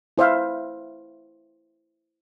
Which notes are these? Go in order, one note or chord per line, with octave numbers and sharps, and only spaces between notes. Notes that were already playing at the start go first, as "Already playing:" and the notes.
E4 C5 E5 F5